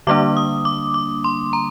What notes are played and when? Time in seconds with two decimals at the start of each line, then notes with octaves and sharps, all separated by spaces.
0.07 D3 G3 A#3 D4 D6
0.37 D#6
0.65 D6
0.94 D6
1.24 C6
1.53 A#5